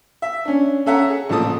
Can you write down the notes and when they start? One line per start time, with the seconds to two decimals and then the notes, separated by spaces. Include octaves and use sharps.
0.22 E5
0.45 C#4 D4
0.86 C#4 A4 E5 F#5 A#5
1.10 G#4
1.29 A1 A#2 F3 A4 A5 D#6